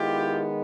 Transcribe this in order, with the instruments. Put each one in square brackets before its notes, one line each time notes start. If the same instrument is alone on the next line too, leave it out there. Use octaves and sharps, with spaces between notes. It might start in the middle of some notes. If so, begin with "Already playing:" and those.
Already playing: [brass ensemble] D#3 G#3 B3 E4 F4 G4